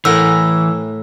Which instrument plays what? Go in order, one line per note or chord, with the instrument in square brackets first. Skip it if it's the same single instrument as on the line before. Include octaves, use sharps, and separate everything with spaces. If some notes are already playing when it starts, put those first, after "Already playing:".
[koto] A2 A#4 F#5 [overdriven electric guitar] E3 [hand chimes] E6